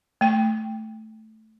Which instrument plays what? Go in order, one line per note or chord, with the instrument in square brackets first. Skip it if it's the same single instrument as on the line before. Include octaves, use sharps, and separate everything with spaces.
[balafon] A3 G5